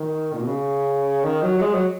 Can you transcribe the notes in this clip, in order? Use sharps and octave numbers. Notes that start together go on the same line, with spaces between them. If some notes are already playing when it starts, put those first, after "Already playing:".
Already playing: D#3
A#2
B2
C#3
D#3
F#3
F#3
G#3
F#3